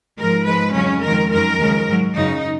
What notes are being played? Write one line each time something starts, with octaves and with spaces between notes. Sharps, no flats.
G#2 F3 G#3 A#4
G#2 F3 G#3 B4
F2 C#3 F#3 C#4
F2 D#3 G#3 A#4
F#2 D#3 G#3 A#4
D#2 C#3 F3 G#3
G#2 F#3
F#2 C#3 F#3 D#4